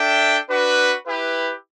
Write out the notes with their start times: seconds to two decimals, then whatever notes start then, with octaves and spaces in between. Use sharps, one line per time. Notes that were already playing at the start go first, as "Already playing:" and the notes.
Already playing: D4 A4 E5 G5
0.49 D4 F#4 B4
1.06 E4 G4 B4